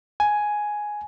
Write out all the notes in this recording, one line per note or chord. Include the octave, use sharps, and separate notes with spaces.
G#5